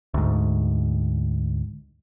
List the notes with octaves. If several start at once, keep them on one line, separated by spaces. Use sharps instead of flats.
D2 G#2